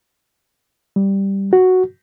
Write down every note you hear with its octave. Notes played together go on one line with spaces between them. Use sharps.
G3
F#4